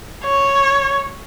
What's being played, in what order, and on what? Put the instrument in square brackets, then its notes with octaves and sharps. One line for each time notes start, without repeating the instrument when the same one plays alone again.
[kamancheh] C#5